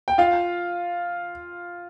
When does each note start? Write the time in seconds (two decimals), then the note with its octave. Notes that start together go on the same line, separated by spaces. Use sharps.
0.08 G5
0.18 F4 F5